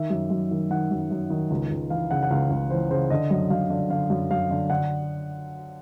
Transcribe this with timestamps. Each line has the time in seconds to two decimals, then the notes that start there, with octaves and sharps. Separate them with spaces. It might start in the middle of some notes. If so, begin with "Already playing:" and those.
Already playing: D#3 E5
0.10 F#2
0.30 F#2
0.51 D#3
0.70 D#3 F#5
0.91 F#2
1.11 F#2
1.30 D#3
1.50 C#2
1.70 C#2
1.90 E3 F5
2.11 C#3 F#5
2.23 F#5
2.30 C#2 F5
2.50 C#2
2.70 E3 C5
2.91 C#3 C5
3.10 D3 D#5
3.31 F#2
3.50 F#2 F5
3.70 D3
3.90 D3 F5
4.10 F#2
4.31 F#2 F5
4.50 D3
4.70 D3 F#5